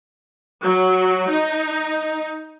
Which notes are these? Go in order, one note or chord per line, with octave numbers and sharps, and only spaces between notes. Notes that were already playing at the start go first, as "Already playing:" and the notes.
F#3
D#4